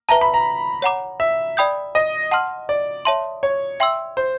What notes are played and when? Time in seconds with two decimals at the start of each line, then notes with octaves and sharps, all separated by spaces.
0.09 B4 E5 A5 A#5
0.21 B5
0.34 A#5
0.82 C#5 F#5 A#5 D6
1.20 E5
1.57 D5 G5 B5 D#6 G6
1.95 D#5
2.31 F#5 A5 C6 F6
2.69 D5
3.05 C#5 E5 A5 C6
3.43 C#5
3.80 E5 G5 C6 E6
4.17 C5